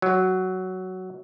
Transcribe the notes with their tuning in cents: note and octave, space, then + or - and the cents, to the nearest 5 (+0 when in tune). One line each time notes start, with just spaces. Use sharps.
F#3 +5